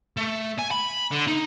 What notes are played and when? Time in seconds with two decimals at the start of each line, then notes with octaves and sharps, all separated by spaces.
0.17 A3
0.59 G#5
0.71 B5
1.11 D3
1.27 D#4